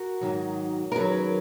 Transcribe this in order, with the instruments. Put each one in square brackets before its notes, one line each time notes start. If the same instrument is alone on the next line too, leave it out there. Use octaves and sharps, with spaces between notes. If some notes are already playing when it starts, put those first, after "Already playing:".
Already playing: [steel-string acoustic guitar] F#4 A#4
G#2 D#3 F#3
A#4
F#2 D#3 F#3 G#4 B4